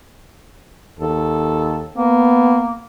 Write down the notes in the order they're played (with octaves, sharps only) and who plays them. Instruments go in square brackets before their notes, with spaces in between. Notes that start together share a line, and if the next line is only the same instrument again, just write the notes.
[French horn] D#2 [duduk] A4
[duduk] A#3 [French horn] B3